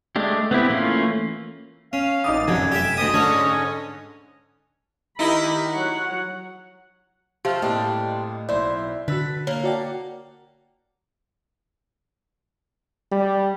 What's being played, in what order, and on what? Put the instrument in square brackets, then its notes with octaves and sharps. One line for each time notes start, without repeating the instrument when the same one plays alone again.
[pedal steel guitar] G#3 A3 D4 G4
B3 C4 E4 G4
E3 A3 A#3 C#4 F4
[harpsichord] C#4 [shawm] F5
[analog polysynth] A1 A6 [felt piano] D#4 D6 D#6
[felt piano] F1 F#2 [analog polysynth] D3 [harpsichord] F#3 [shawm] G#5
[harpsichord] G4 E5 [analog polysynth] D7 D#7
[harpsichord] D2 C5 D#6 [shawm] D#5
[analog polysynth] G#2 D3 C#4 [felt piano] D4 [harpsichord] C#5
[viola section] D#3 G4 B5 [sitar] D#4 E4 D#5
[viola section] F#3 C#5 F#5
[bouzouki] F3 A3 [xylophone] G4 F5 [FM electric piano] G5 F6
[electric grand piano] A2 A#3 F6 [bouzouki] G3 C4 D4 [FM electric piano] D#5
[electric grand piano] B1 E4 [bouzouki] C5 E5 [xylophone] D5
[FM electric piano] D3 F#4 [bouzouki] B4 [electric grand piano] E6 A6 B6
[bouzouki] A#3 [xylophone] C#5
[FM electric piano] F#4 D5 G5 [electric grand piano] F#5 A5 A#5
[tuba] G3